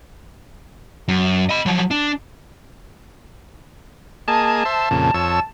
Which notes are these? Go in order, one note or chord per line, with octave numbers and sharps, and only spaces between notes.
F#2
D#5 B5
F3 F#3
D4
A#3 G#4 D#5 A5
C5 E5
F2 A#2 C#3
F2 C#5 E6